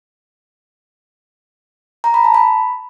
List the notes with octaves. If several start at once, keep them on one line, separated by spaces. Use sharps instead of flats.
A#5
B5
A5
B5